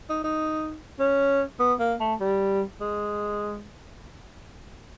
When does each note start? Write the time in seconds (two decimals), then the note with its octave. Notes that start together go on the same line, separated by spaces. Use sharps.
0.10 D#4
0.24 D#4
0.99 C#4
1.59 B3
1.80 A#3
2.00 A3
2.20 G3
2.81 G#3